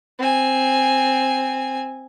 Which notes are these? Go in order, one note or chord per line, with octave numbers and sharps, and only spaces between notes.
C4 G#5